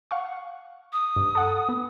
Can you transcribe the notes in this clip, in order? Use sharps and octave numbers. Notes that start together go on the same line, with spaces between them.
F5 F#5 C#6
D#6
G2
A4 F#5
B3